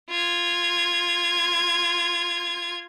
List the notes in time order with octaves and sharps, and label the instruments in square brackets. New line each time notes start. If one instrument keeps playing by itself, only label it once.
[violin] F4 G#6